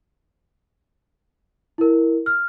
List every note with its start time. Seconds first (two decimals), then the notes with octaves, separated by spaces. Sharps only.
1.78 E4 A#4
2.26 F6